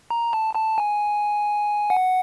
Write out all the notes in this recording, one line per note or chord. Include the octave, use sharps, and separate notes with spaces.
A#5
A5
A5
G#5
F#5